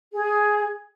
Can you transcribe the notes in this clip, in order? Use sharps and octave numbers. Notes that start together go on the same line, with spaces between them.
G#4